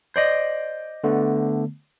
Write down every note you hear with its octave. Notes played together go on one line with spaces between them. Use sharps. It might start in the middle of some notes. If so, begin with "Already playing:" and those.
C5 D5 D#5
D3 A3 B3